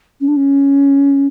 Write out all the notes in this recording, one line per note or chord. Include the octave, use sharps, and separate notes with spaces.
C#4
D4
C#4